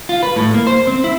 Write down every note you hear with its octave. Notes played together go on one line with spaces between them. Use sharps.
F4
B4
A2
A#3
C5
C4
E4